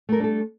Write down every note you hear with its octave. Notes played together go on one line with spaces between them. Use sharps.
G3 A3 D4 A4 A#4